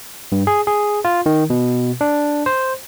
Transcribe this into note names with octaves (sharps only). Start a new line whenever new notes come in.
G2
G#4
G#4
F4
D#3
B2
D4
C5